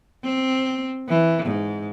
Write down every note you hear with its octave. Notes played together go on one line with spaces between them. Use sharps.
C4
E3
G#2